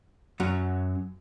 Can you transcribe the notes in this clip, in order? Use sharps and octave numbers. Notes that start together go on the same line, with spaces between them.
F#2 F#3